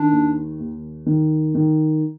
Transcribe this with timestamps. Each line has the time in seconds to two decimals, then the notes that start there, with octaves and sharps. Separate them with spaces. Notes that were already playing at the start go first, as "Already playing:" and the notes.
Already playing: D#3 D4
0.12 D#2
0.60 D#2
1.06 D#3
1.55 D#3